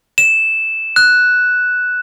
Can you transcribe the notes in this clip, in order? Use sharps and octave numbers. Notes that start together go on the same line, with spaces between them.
E7
F#6